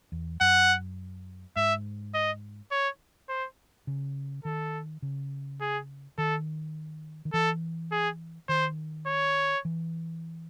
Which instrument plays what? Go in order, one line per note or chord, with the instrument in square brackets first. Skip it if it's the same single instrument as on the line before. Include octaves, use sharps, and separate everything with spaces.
[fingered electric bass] E2
[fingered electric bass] F#2 [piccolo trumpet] F#5
[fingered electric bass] G#2 [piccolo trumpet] E5
[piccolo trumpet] D#5
C#5
C5
[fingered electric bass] C#3
[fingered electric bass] D#3 [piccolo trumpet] A4
[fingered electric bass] C#3
[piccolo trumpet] G#4
[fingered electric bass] D#3 [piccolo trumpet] A4
[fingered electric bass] D#3
[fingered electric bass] E3 [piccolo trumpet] A4
[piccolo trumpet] G#4
[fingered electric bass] D#3 [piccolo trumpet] C5
[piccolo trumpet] C#5
[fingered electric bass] E3